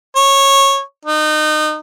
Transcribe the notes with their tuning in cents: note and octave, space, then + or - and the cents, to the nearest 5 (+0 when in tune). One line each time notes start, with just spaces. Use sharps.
C#5 -15
D#4 -25